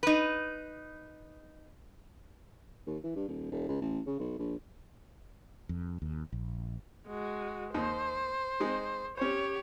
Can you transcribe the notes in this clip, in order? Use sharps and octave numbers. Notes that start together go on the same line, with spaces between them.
D#4 B4
D#2
E3
G2
D#1
E1
C#2
A1
C#3
B1
A#1
F2
D#2
A#1
G#3 F#4
D#2 D#4 C5
G#3 C4 D#4
C#4 G4 C5 C#5